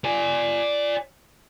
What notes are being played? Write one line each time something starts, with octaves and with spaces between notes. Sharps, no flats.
D5 G#5